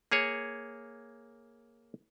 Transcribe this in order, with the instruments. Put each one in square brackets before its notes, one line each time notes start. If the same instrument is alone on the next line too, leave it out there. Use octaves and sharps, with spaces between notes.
[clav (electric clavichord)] A#3 G#4 C#5